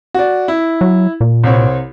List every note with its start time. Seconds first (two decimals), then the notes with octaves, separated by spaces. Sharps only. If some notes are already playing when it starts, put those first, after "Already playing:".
0.14 F#4 D5
0.48 E4
0.81 F#3
1.21 A#2
1.44 C2 C4 C#5